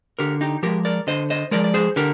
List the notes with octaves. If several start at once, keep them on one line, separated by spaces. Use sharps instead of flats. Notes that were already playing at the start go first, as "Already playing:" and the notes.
D3 G4 A#4
D#4 G4
F3 G#3 G4 A#4
A#4 D5
D3 C5 D#5
C5 D#5
F3 G#3 A#4 D5
D5
G#4 C5
D3 G4 A#4